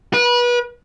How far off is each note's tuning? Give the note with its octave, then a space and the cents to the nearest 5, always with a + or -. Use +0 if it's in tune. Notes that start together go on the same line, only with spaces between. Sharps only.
B4 -30